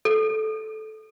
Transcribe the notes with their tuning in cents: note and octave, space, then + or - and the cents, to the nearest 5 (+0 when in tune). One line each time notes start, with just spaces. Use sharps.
A4 -15